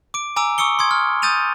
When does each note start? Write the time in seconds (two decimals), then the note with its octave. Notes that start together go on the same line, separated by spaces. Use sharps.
0.14 D6 D7
0.36 G#5 A#5 D6 E6 D7
0.58 C#6 D#6 E6 C#7 G7
0.79 C6 D#6 G#6
0.91 F6
1.22 D#6 G6 A6 D#7 F7